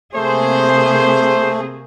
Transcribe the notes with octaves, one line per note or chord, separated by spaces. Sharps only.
C3 A3 A#3 G#4 C5